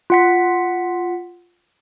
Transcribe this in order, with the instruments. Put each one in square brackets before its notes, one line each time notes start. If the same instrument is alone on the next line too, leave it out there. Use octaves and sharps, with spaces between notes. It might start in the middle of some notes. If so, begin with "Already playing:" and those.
[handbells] F4 F#5 B6